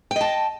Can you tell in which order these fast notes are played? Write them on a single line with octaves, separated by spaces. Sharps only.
G5 D#5 A5